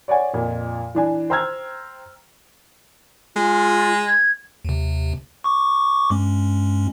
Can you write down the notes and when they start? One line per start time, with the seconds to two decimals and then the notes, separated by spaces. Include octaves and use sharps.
0.08 C#5 D5 F#5 G#5
0.33 F2 A#2
0.95 E3 D4 G#5
1.30 C5 G5 A#5 E6 F6 G#6
3.36 G#3 F4
4.07 G#6
4.65 D#2 C3
5.44 C#6 D6
6.10 G2 G#3 C#4